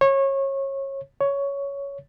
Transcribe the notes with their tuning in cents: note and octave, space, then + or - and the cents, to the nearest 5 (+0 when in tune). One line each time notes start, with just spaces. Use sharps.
C#5 -25
C#5 +10